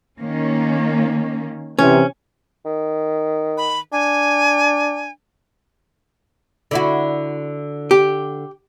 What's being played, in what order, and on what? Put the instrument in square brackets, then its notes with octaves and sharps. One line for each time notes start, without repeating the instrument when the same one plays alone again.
[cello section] D#3 A#3 C#4
[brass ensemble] C3 E3 [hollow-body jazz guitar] C#4
[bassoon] D#3
[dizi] B5
[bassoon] D4 [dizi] G#5
[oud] D3 E4 F#4
[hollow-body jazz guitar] G4